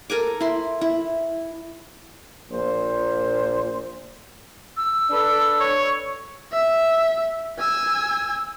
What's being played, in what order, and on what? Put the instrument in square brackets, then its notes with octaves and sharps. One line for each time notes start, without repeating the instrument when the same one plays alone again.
[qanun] A4 A#4 G#5 D6
E4 C6
E4
[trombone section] A#1 A#2 C5
[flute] E6
[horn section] D4 A4 B4
[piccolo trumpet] C#5
[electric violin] E5
G#5 E6